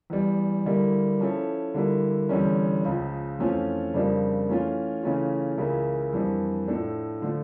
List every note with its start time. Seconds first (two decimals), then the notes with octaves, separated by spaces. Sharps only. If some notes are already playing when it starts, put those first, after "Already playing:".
0.10 E2 E3 G3
0.65 D3 G3 A#3 E4
1.20 F3 C#4 E4 A4
1.74 D3 G3 A#3 E4
2.29 E2 D3 G3 C#4
2.85 C#2 C#3 F3
3.39 F2 E3 A3 C#4 F4
3.94 F2 C#3 G3 A#3 D4
4.49 E3 A3 C#4 F4
5.03 C#3 E3 A3 C#4 F4
5.58 C#2 C#3 E3 A#3 E4
6.13 F2 E3 G3 A#3 D4
6.68 A2 F3 A3 D4 A4
7.22 D3 F3 A3